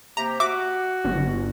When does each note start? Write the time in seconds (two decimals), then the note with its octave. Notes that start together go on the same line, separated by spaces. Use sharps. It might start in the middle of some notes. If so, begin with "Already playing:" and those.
0.17 C3 A#3 G4 A#5
0.40 F#4 E5 D6
1.05 G1